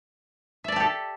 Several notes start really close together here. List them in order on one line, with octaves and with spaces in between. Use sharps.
E5 D5 A5 G4 A4